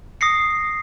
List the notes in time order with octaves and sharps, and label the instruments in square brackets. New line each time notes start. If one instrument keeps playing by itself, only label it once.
[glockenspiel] D#6 A#6 C7 C#7